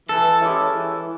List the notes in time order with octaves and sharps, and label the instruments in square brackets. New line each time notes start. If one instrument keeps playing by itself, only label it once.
[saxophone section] E3 [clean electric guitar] A4
[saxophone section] G#3 C#4 E4 G4
E3